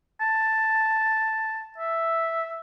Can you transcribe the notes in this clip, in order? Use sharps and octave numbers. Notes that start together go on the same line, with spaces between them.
A5
E5